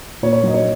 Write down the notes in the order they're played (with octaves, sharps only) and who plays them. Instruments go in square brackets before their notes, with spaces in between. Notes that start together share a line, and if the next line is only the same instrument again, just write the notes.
[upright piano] A#2 C#5
C#5
F#3 D#5
C#5